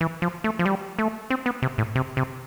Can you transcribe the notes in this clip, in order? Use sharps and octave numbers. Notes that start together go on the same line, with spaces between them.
E3
F3
A3
F3
G3
A3
C4
B3
C3
A2
C3
C3